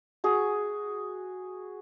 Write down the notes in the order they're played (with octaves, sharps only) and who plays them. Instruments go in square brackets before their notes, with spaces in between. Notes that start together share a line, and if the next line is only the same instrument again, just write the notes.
[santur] F#4 G#4